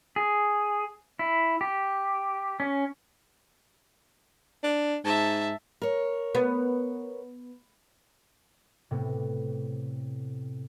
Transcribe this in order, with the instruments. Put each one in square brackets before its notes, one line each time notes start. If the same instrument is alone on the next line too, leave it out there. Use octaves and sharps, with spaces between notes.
[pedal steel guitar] G#4
E4
G4
C#4
[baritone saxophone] D4
[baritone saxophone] G#2 [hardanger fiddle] E5 A5
[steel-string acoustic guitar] A#4 C#5
[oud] B3
[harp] A2 C3 B3